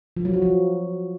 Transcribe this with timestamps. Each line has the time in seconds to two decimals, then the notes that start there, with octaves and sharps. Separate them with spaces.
0.17 F3
0.25 F#3
0.34 F#4
0.42 F3